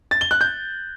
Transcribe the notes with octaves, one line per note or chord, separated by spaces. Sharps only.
A6
G7
F#6
G6